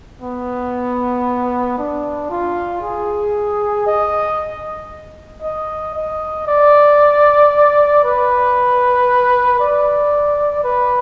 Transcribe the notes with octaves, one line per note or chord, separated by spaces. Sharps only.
B3
D4
F4
G#4
D#5
D#5
D#5
D5
B4
D5
B4